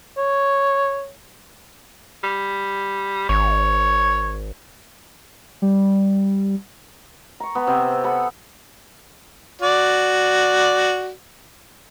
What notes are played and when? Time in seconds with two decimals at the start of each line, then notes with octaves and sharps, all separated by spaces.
0.17 C#5
2.24 G3
3.29 G#1 C#5
5.62 G3
7.40 A#5 C#6
7.55 B3 B5
7.67 C3 B3 C4
8.04 A4 F#5 B5
9.62 F#4 D5